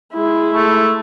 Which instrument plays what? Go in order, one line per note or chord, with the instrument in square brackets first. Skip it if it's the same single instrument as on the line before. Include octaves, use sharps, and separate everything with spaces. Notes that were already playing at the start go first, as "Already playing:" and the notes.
[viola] G#3 E4
[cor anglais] A3